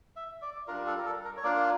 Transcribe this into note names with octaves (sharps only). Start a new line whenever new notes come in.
E5
D5
G3 D4 F4 A#4
A4
A#4
A4
A#4
C#5
A#3 D4 F4 D5